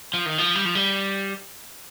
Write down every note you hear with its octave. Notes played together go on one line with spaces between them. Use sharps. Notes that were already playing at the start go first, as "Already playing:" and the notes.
F3
D#3
F3
G3
F3
G3